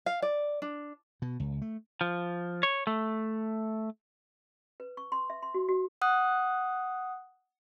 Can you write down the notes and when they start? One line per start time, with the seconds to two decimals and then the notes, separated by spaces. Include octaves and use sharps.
0.06 F5
0.22 D5
0.62 D4
1.22 B2
1.40 C#2
1.62 A3
2.01 F3
2.63 C#5
2.87 A3
4.80 B4
4.97 C#6
5.12 C6
5.30 E5
5.42 C6
5.54 F#4
5.69 F#4
6.01 F#5 D#6 F#6